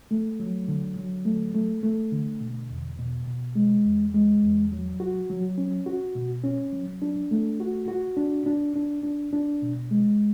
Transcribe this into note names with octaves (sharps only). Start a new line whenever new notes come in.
A3
F#3
D3
F#3
A3
A3
A3
D3
B2
E2
B2
B2
G#3
E2
G#3
E2
F#3
F#4
F#3
C#4
F#4
B2
C#4
F#3
D4
A3
F#4
F#4
D4
D4
D4
D4
D4
B2
G#3